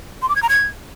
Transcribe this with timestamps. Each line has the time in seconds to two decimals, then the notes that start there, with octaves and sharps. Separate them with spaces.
0.22 C6
0.29 D6
0.36 G#6
0.42 A#5
0.49 G#6